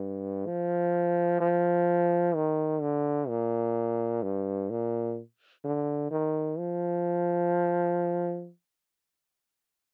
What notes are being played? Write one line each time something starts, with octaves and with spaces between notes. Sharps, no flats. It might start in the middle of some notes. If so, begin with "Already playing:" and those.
Already playing: G2
F3
F3
D#3
D3
A#2
G2
A#2
D3
D#3
F3